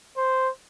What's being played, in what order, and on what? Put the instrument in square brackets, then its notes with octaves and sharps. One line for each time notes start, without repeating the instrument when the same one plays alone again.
[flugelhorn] C5